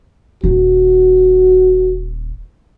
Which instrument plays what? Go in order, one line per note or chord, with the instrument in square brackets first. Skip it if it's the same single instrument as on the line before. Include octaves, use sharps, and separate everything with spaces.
[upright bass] D#1 [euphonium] F#4